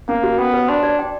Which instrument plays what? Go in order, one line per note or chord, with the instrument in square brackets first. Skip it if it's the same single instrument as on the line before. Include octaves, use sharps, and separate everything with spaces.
[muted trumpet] A#3 [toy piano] C#4
[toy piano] F#4
[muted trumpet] B3 [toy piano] G5
[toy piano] B4
[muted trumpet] D4 [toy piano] C6
[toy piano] D5
G5